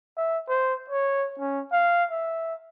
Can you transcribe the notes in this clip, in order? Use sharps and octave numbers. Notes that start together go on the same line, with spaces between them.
E5
C5
C#5
C#4
F5
E5